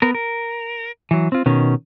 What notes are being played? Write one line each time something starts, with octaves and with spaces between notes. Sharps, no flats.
B3 A#4
A#4
E3 F#3
C4 F4
B2 D#3 C#4